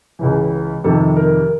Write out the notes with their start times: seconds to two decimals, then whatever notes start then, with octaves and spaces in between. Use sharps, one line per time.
0.19 C#2 C#3 E3
0.84 F2 C3 D#3 A4
1.16 A#4